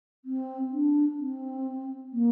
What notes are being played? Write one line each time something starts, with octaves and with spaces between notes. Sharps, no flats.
C4
D4
C4
A#3